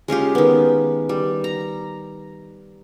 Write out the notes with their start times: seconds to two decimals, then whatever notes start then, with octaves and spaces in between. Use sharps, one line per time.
0.08 G#3 C#4 F4 G4
0.35 D#3 B3
1.09 G3
1.44 A#5